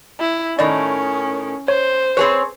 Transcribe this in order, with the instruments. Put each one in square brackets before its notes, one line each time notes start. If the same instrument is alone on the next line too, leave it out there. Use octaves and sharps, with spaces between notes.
[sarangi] E4
[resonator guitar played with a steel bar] A2 D#3 [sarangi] C#4 [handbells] D5 D#5
[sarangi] C5 [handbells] C#5
[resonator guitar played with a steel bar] C4 G#4 C#5 [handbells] B4